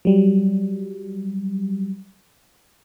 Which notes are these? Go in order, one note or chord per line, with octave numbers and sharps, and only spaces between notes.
F#3 G3